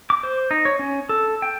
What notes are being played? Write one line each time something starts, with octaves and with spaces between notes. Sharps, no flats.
D6
C5
D#4
C#5
C#4
A4
G5